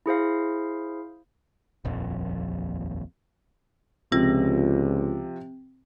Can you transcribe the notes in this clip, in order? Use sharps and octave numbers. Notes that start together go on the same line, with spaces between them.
E4 G#4 C5 F5
D#1 A#1 F2
C#2 C3 F3 C4